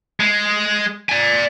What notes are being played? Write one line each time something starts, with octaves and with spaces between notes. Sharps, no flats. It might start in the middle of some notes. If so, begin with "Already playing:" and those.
G#3
D5 G#5